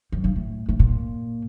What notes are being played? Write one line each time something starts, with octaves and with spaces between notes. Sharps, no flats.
F#2
G2
A2
A2
A#2